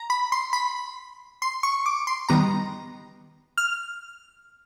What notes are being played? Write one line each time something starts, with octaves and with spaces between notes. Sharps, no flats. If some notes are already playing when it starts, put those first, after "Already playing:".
Already playing: A#5
B5
C6
B5
C6
C#6
D6
C6
D#3 G3 B3 A#5
F6